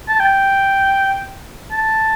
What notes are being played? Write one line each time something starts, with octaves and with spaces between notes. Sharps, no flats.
A5
G5
A5